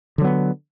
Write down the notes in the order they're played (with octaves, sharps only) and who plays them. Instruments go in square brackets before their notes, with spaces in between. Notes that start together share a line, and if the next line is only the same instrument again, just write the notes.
[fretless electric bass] D3
F#3
B3